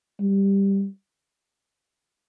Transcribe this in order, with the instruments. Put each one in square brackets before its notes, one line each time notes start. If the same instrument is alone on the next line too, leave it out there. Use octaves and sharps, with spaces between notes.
[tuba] G3